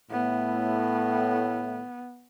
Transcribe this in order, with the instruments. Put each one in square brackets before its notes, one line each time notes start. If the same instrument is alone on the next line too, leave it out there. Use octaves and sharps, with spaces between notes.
[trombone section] A2 [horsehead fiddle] B3